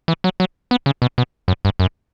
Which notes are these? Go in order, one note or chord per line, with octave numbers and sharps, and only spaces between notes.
E3
F#3
F#3
B3
C#3
B2
B2
F#2
G2
F#2